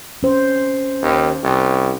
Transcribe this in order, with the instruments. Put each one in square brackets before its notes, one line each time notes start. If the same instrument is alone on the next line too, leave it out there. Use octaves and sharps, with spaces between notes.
[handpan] C#4 C5
[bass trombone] D#2
C2